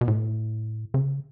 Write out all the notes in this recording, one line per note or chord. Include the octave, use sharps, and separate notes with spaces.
B2
A2
C#3